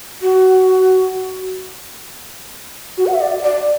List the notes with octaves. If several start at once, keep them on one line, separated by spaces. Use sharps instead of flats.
F#4
F#4
F#5
E5
D5
D5